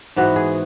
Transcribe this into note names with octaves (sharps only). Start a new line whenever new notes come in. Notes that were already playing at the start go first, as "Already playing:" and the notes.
G#2 E3 B3 F#4
G#4